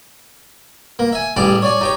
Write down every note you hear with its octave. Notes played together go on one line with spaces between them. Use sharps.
A#3
E5 G#5
A1 G3 G#4 A5 D6
C#5 D5 G#5
D#4 G4 C#5